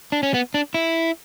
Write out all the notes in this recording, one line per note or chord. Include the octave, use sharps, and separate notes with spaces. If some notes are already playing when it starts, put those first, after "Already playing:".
D4
C#4
B3
D4
E4